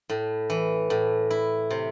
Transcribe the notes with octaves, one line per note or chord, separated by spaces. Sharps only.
A2
E3
A2
E4
C3